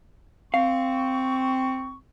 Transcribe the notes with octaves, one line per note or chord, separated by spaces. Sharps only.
C4 F5 C#6